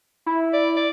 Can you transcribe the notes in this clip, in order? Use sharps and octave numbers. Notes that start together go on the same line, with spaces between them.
E4
D5
D5